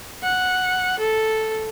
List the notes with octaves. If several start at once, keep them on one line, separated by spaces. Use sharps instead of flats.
F#5
A4